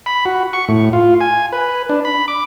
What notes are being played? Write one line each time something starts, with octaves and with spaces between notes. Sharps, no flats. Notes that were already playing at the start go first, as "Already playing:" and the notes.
B5
F#4
C#6
A2
F4
G#5
B4
D4
B5
D6